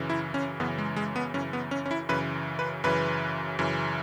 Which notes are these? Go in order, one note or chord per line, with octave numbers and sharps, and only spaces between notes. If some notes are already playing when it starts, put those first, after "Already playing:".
Already playing: F#2 C#3 E3
E4
C#4
F#2 C#3 E3 B3
G#3
G#3
B3
F#2 C#3 E3 C#4
B3
C#4
C#4
E4
F#2 C#3 E3 B4
B4
F#2 C#3 E3 B4
F#2 C#3 E3